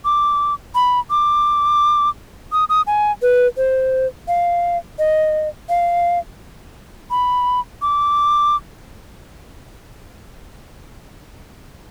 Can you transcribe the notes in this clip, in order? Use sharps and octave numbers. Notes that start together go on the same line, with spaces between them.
D6
B5
D6
D#6
D#6
G#5
B4
C5
F5
D#5
F5
B5
D6